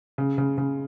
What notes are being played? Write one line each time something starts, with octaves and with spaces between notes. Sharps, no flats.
C#3
C#3
C#3